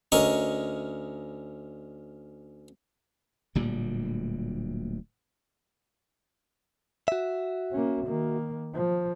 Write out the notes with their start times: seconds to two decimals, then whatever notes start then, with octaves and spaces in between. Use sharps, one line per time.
0.12 D2 C#4 A#4 D#5 C#6 D#6
3.55 D1 D2 A#2 G3
7.08 F#4 E5
7.72 A#3 C#4
8.06 D#3 A#3
8.74 F3